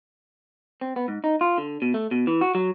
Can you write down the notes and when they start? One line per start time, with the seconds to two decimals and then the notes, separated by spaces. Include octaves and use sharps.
0.81 C4
0.96 B3
1.08 G#2
1.24 D#4
1.41 F4
1.58 D3
1.82 B2
1.94 A3
2.11 B2
2.27 E3
2.41 F#4
2.55 F#3